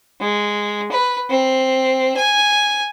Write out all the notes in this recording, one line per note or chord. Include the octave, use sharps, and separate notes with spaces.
G#3
B4
C4
G#5